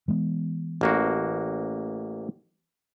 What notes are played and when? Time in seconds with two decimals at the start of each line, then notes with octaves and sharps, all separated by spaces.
0.08 E3 G#3 B3
0.81 A1 A#3 F#4